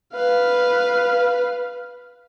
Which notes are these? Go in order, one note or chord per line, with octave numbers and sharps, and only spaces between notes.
B4 F5